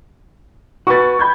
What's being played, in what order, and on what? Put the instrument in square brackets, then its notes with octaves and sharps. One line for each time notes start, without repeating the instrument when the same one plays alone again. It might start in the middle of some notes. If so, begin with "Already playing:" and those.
[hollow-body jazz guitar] F#4 B4 [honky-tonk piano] C#6 A6
[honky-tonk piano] B5 G6 G#6